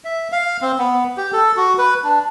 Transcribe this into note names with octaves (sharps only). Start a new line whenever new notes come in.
E5
F5
C4
B3
G4
A4
F#4
B4
D4